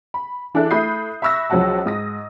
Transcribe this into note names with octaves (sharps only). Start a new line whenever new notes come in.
B5
E3 D4 E4 G#4 A4 F#6
A3 E4 B5 D#6 G6 C7
E5 B5 C#6 E6 F#6 A#6
C#2 F3 F#3 F#4 F#5 A5
G#2 D#6 A#6